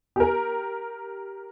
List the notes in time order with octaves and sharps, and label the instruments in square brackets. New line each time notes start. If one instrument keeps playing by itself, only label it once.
[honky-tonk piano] G4 A#4